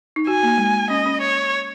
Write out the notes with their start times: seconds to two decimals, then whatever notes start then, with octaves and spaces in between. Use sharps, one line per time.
0.16 D#4
0.27 F#4 G#5
0.43 A#3
0.58 G#3
0.90 C#4 D#5
1.06 C#4
1.21 C#5